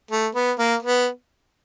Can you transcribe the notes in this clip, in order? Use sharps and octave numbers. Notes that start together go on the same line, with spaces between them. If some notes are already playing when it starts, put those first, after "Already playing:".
A3
B3
A#3
B3